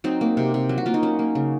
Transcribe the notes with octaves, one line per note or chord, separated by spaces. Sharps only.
F#3 C4 D#4
A#3
C3
C3
F#3
F#4
A#3 F4
D#4
F#3 C#4
A#3
C#3